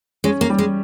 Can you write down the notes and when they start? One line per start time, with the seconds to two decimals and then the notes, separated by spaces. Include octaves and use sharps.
0.24 G#3 C#4
0.41 A#3
0.50 G3
0.59 G#3